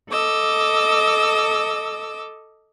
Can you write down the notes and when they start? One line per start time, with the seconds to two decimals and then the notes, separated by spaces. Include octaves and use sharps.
0.10 A4 D#5 D6 E6